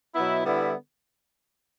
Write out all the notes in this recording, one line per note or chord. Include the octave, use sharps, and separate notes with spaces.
B2 F#3 B3 E4
D3 G3 B3 E4